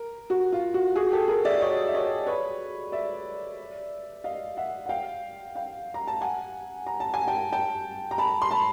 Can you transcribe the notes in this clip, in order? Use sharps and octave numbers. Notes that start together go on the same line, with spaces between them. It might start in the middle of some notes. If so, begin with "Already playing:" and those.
Already playing: A#4
F#4
F4
F#4
F#4 G#4
G4 A4
G#4 A#4
D5 E5
C#5 D#5
E5
C#5 D#5
B4 C#5
D5 E5
D#5 F5
E5 F#5
F#5
F5 G5
F5 G5
A#5
A5
F#5 G#5
A#5
A5
G#5
G5 A5
G5 A5
A#5
A5 B5
C6
A5 B5